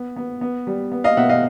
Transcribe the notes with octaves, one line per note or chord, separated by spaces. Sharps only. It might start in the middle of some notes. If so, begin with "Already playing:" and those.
Already playing: B3
B3
B3
G3
B3
D#5 F5
B2 E5 F#5
D#5 F5